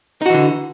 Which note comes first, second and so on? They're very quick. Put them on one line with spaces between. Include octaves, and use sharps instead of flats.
D#4 F#4 E3 D3